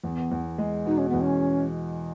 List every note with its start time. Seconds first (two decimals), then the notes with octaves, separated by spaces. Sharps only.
0.04 E2 B3
0.31 E2
0.58 G#3
0.86 B2 D#4
0.98 C#4
1.09 E2 B3
1.21 C#4